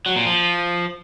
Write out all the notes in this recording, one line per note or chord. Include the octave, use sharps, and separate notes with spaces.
F#3
A#2
F3